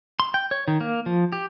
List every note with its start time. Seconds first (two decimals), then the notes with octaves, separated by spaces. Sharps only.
0.20 C6
0.34 G5
0.51 C#5
0.68 D#3
0.81 A#3
1.06 F3
1.33 G4